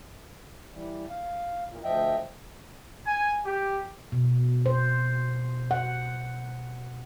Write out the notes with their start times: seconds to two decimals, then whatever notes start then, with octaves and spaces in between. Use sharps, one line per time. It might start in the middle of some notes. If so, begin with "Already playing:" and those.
0.74 E3 G3
1.10 F5
1.69 E2 A#2
1.84 D2 F3 D#5 E5 G5
3.06 G#5
3.44 G4
4.12 B2
4.66 C5
5.71 F#5